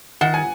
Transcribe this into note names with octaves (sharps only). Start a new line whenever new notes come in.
D#3 F#5
G#5